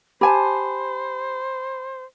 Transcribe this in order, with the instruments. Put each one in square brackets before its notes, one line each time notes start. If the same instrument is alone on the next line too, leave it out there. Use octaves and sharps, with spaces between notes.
[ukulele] G4 G#5 A5 [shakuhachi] C5 [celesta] B5